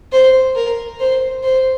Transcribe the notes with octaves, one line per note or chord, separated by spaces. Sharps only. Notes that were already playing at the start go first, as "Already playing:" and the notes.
C5
A#4
C5
C5